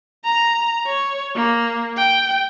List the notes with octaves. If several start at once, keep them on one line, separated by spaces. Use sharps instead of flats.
A#5
C#5
A#3
G5